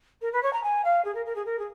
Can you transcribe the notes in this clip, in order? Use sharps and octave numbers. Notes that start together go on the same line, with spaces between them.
A#4
B4
C#5
A#5
G#5
F5
G#4
A#4
A#4
G#4
A#4
G#4